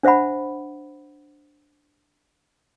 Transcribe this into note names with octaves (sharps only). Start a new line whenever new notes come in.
D4 C5 E5 F#5 B5